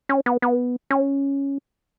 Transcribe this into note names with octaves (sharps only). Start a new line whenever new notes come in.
C#4
B3
B3
C#4